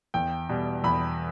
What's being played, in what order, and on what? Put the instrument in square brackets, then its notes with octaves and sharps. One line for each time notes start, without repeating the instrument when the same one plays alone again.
[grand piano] E2 G5
B2 G3
E2 B5